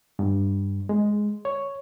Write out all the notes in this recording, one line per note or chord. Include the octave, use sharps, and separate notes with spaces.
G2
G#3
C#5